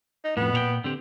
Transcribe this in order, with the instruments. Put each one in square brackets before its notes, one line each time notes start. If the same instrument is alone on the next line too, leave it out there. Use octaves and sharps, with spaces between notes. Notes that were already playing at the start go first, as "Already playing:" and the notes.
[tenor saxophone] D#4
[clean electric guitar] F2 A2 [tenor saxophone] B3
[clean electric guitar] A#2 C#5 G5
D3 C4 G4